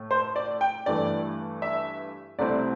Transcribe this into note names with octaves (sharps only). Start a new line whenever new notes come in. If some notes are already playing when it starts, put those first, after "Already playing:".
Already playing: A2 A3
C5
D5
G5
G2 E3 A3 E4 D5
E5
C2 C3 A3 C4 E4 D5